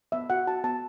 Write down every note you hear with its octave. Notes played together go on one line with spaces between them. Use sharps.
B3 E5
F#4 F#5
F#4 A5
B3 A5